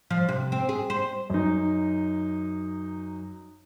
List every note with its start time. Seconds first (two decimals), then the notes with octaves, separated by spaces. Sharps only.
0.11 F3
0.29 C3
0.52 C4
0.69 G#4
0.90 C5
1.30 F#2 D#4